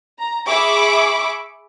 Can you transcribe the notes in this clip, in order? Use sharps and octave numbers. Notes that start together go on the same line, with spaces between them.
A#5
G#4 E5 B5 C#6 D6